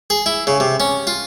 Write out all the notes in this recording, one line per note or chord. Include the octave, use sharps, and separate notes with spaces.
G#4
E4
C#3
C3
C#4
F4